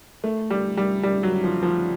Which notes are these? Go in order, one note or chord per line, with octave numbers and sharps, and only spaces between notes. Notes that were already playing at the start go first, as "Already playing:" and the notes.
A3
G3
G3
G3
F#3
F3
F3